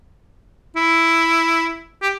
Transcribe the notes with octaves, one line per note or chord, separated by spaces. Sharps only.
E4
G4